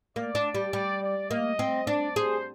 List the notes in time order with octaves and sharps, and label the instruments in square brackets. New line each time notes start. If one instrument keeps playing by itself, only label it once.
[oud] A#3 [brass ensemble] D5
[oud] D4
G3
[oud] G3 [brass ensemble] D5
[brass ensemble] D5
[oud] A#3 [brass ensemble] D#5
[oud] C4
[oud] D4 [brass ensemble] D5
[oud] G#4 [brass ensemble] C5